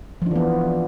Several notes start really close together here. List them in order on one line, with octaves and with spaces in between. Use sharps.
F3 D4 E3 B3